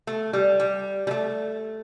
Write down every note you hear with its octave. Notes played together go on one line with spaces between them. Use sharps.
A3
G3
G3
G3
A3